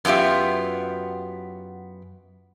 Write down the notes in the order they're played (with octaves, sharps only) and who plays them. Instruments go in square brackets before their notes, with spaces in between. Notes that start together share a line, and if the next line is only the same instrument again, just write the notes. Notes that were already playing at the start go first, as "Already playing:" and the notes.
[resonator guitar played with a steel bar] F#2 B3 F4 G4 E5